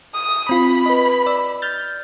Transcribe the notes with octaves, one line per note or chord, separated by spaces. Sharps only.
D#6
C4 F4 B5
B4 D#5
D5 E6
F6 G6 A6